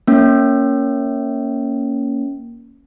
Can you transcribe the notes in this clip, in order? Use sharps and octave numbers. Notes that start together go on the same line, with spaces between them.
A#3 C#4